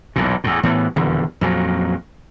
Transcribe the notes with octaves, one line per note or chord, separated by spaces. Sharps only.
B1 E2 A#2
E2 A2
A2 E3 B3
D#1 E2 D3
F2 A#2 F#3